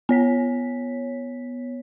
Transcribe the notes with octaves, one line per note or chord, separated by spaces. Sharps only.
B3 C#5 B6